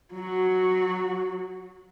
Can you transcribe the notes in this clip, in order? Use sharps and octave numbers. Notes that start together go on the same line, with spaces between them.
F#3 F#4